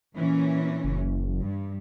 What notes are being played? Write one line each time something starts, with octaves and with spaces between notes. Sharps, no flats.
A#2 E3 C#4
F#1
G2